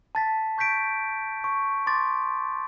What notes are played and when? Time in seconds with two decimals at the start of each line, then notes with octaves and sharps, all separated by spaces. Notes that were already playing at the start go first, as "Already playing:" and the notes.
0.15 A5 A6 B6
0.58 C#6 G6 A6 B6 D7
1.44 C#6
1.87 C6 D6 A6